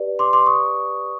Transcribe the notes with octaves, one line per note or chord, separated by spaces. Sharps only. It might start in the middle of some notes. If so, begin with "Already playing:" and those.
Already playing: G4 B4 D5
C6 D6
C6 D6
C#6 D#6